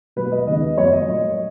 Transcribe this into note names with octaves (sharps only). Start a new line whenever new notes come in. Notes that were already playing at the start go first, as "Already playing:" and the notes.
B2 F#3 A#3 B4
D#5
D#2 C#3 G#3 B3 D#5
F#2 F3 B3 C#5
D#5
A#2 F#3 A#3